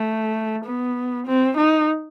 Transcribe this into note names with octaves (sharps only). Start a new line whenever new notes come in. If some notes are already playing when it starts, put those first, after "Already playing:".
Already playing: A3
B3
C4
D#4